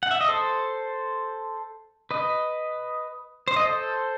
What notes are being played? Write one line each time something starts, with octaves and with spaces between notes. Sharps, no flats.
F#5
E5
D#5
A4 C5
B4 D#5
C5
D#5
A4 C5